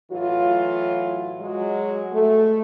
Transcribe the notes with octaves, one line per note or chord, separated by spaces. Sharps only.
A2 E3 F#3 F4
F#3 G#3
A3